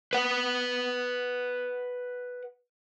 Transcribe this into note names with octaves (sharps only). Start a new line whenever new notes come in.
B4 F#5